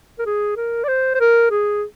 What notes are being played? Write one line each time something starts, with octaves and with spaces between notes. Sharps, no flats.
A#4
G#4
A#4
D5
C5
C5
A#4
G#4